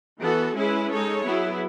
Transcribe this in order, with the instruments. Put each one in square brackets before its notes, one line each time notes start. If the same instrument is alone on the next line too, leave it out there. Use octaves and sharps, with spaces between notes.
[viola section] E3 B3 F#4 A4
G#3 C#4 E4 G#4 B4
G#3 D#4 A4 C#5
F#3 B3 E4 G#4